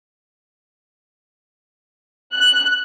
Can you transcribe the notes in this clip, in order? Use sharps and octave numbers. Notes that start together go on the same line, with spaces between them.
F#6